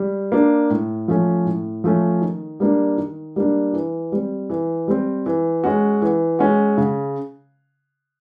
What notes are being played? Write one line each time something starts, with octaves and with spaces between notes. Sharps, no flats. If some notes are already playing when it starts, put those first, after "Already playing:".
Already playing: G3
A#3 D4
A2
F3 A3 C#4
A2
F3 A3 C#4
D#3
G3 A#3 D4
D#3
G3 A#3 D4
E3
G3 C4
E3
G3 C4
E3
G#3 C#4 F#4
E3
G#3 C#4 F#4
C#3